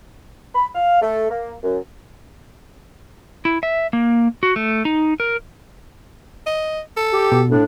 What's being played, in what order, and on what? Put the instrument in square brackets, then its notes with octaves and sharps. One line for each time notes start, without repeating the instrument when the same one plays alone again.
[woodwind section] B5
F5
A3
A#3
F#2
[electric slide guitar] E4
E5
A#3
F#4
A3
D#4
A#4
[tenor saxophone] D#5
A4
[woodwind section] G4
[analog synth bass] B2
[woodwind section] A2 D4